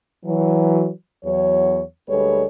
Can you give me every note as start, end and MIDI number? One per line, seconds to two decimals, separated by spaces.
0.25 0.89 52
0.25 0.89 54
1.24 1.80 40
1.24 1.80 54
1.24 1.80 73
2.09 2.44 38
2.09 2.44 55
2.09 2.44 56
2.09 2.44 69
2.09 2.44 71
2.09 2.44 73